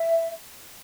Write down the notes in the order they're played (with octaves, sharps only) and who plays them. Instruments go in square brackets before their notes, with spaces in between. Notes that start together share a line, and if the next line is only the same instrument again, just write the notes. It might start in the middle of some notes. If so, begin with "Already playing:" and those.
Already playing: [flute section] E5